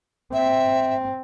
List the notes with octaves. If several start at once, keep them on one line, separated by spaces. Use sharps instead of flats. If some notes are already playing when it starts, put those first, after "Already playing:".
C4 E5